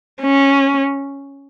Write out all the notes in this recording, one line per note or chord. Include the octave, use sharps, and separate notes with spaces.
C#4